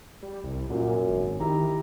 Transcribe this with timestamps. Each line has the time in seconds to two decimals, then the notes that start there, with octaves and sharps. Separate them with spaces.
0.22 G3
0.44 C2
0.69 F#2 A#2
1.10 G#1
1.40 D#3 E4 G4 A#5